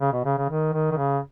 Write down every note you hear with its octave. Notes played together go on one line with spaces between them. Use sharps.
C#3
B2
C#3
C#3
D#3
D#3
D#3
C#3